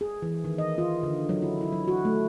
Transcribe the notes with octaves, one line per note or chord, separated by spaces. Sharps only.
G#4
E3
D#3
D#5
F4
D3
F#3
E4
E4
F#3
F#4
A3